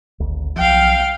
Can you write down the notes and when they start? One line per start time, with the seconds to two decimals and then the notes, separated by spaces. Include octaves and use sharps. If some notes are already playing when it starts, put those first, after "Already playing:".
0.20 G#1 D2
0.56 B1 F3 F5 G5